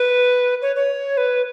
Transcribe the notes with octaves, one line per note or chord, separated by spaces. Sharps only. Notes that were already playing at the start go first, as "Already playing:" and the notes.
Already playing: B4
C#5
C#5
B4